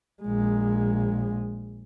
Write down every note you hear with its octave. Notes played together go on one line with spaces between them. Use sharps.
A#1 G#3